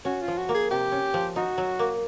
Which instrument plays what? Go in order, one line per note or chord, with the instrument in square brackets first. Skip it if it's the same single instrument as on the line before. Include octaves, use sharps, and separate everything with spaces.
[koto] C#4 [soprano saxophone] F#4
[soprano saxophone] F4
[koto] F3
[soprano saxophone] F#4
[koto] A#3
[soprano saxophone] G#4
[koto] C3 [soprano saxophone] G4
[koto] C#4
F3
[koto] D#4 [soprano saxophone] F#4
[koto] F#3
A#3